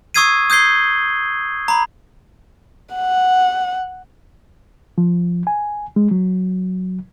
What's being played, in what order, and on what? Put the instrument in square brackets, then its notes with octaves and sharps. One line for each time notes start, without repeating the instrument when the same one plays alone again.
[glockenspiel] C#6 D#6 E6 G#6 C7 D#7
D#6 G6 G#6 C7 G7
A#5 B5
[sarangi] F#5
[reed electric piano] F3
G#5
G#3
F#3